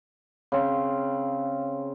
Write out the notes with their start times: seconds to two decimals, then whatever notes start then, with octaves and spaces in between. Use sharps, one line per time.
0.52 C#3 C4